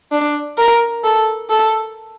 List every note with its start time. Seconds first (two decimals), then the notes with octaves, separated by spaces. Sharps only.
0.12 D4
0.58 A#4
1.04 A4
1.50 A4